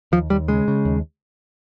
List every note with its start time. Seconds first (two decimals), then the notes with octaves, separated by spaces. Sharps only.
0.12 D#2 F3
0.30 D#2 G3
0.48 C#3 G#3
0.68 C#3
0.85 D#2